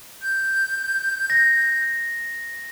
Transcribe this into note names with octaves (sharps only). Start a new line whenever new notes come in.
G6
A#6